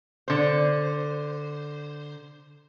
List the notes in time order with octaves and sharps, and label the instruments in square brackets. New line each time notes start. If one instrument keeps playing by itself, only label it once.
[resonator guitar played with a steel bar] D3 C5